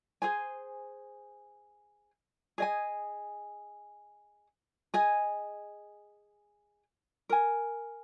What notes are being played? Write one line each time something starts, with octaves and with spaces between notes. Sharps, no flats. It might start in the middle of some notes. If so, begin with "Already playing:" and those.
G#4 C5 G#5
G#4 D#5 G#5
G#4 D#5 G#5
A#4 G#5